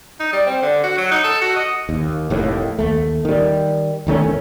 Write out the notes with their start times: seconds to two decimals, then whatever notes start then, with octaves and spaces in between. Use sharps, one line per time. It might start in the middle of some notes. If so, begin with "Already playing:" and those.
0.20 D#4
0.33 G3
0.46 C4
0.62 D3
0.83 F#4
0.98 F#3
1.11 D#4
1.24 A4
1.41 F#4
1.56 D#5
1.89 D#2
2.30 F1 D#2 A2
2.79 D#2 A3
3.25 D#3 G3
4.07 E1 D#3 A3 C#4